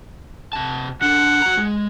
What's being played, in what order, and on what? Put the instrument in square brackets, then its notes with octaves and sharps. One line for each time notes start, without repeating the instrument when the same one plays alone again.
[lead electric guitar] C3 A5
[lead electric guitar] C#3 D4 [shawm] F#5
[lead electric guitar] F#4 A#5
G#3